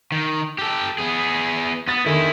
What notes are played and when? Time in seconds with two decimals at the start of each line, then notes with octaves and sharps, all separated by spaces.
0.12 D#3
0.58 G4 A4
0.98 B3 G#4
1.88 B3 D#6 A6
2.06 D3 D#3 E4 G#4